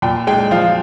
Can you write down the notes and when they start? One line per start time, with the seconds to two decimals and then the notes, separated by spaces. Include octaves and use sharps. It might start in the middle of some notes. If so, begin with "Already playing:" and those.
0.02 A#2 G5
0.27 G#3 G5
0.51 F3 F5